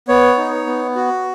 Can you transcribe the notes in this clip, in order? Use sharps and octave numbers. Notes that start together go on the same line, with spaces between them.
B3 C#5
D#4
B3
F#4